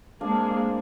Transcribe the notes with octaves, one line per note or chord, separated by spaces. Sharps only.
G#3 A#3 C4 D4 G#4 F5